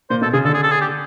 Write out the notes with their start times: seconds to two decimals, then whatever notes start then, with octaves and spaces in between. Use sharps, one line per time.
0.10 A#2 C5
0.21 B2 A4
0.33 C#3 G#4
0.45 D3 A4
0.54 G#4
0.63 A4
0.72 G#4
0.81 G4